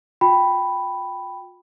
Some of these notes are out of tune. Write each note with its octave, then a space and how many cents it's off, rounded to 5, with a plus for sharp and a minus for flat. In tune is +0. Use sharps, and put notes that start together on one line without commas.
F4 +40 G5 +0 B5 +0